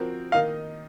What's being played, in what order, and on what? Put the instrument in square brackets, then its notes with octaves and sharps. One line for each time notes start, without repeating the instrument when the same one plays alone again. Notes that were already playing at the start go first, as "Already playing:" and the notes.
Already playing: [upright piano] F3 C4 F#4 A#4
[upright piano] D#3 A#3 D#4 A#4 D#5 [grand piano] F5